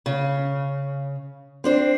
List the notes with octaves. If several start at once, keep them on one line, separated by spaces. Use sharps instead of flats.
C#3
C4 D4 C5